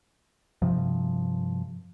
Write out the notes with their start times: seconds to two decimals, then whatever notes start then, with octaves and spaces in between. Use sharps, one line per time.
0.62 G2 C3 F3